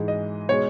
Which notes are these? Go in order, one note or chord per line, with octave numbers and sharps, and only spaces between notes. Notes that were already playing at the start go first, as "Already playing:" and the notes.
Already playing: G#2 E3 G#3
D#5
B2 G#3 D#4 C#5